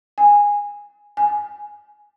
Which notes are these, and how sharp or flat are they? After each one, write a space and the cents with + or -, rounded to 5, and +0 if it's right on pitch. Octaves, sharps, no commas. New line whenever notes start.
G#5 -15
G#5 +5